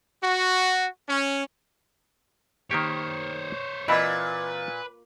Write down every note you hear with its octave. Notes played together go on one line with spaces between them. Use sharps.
F#4
C#4
D#3 A#3 G4 C5 C#5
A#2 E3 C4 E4 B4 D#5 B5